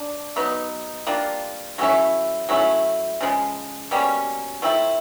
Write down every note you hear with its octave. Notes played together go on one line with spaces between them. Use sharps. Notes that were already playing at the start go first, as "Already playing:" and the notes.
Already playing: D4
F#3 B3 D#4
G3 A#3 D4 F4
F#3 A3 C#4 E4
F#3 A3 C#4 E4
C#3 F3 G#3
B2 G3 A#3 C#4
F3 A3 C4 E4